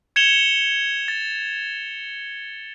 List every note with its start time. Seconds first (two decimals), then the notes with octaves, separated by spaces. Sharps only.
0.16 G#6 C#7 E7 F7 G7
1.08 A6